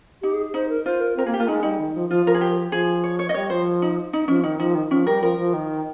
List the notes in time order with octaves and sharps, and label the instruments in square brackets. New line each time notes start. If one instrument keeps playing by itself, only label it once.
[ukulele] D#4 [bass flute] G4
[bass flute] G#4
[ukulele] D#4 [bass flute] C5
[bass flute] A#4
[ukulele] F4 [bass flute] C5
[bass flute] A#4
[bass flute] C4 [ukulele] A#4
[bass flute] A#3 [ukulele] G#4
[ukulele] G4
[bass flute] A#3 [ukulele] F4
[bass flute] G#3 [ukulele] D#4
[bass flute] G3 [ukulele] D#4
[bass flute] D#3
F3
[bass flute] F3 [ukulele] F4
[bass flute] F3 [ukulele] A#4
[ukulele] G#4
G4
[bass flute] F3 [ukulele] G#4
[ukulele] C#5
C#5
D#5
[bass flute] G3 [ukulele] C#5
[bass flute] F3 [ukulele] C5
[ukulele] D#4
D#4
[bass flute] F3 [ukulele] C#4
[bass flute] D#3 [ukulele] D#4
[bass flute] F3 [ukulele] D#4
[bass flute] D#3
[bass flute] F3 [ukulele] C#4
[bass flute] G3 [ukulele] A#4
[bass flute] F3 [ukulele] A#4
[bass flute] F3
D#3